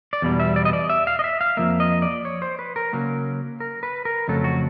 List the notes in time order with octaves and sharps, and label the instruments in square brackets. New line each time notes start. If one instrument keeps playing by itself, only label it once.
[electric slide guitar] D5
E2 B2 G3
E5
D5
D#5
D5
E5
F5
D#5
E5
F5
F2 C#3 F3 A#3 E5
D#5
D5
C#5
C5
B4
A#4
C#3 F#3 A#3 C#4
A#4
B4
A#4
F2 C#3 F#3 A3 A4
F#4